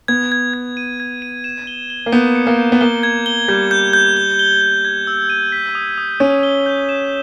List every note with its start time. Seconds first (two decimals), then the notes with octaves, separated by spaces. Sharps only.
0.08 B3 G#6
0.32 G#6
0.54 G#6
0.77 D#7
1.00 G#6
1.22 D#7
1.44 E7
1.67 G7
1.90 G7
2.06 A#3
2.12 B3 G6
2.35 C#7
2.47 A#3
2.58 G6
2.72 B3
2.81 A#3 G7
3.03 G#6
3.26 G7
3.48 G3 G6
3.71 G6
3.93 G6
4.17 G7
4.39 G7
4.61 G7
4.85 G#6
5.07 E6
5.30 D#7
5.52 B6
5.75 D#6
5.98 D#6
6.20 C#4 G6
6.43 G7
6.66 G6
6.89 E7